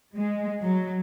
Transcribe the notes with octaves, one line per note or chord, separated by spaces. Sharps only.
G#3
F#3